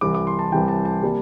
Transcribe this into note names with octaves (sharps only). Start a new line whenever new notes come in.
C2 C3 E3 D6
D6
C6
A5
C2 C3 E3 G5
A5
A5
C3 G3 A#3